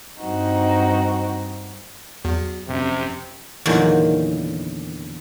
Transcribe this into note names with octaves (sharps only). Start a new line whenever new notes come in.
G2 C4 D#4 F#4
E2 F#3
F1 F#2 C3
E2 A#2 D3 D#3 F#3